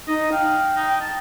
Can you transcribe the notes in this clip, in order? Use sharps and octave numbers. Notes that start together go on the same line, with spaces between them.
D#4 D#5
F5 G5
D#4
A5